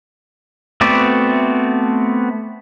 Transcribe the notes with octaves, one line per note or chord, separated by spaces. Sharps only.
A3 B3 C4 F#4 D5